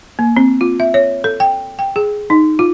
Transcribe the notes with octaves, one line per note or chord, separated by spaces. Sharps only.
A#3
C4
F4
E5
C#5
A4
G5
G5
G#4
D#4
F4